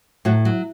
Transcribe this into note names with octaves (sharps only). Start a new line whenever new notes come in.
A2 F#3 F#4
F#3